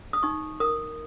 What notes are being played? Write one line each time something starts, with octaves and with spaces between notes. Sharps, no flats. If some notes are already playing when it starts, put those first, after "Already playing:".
D#6
D#4 C#6
A#4 D#6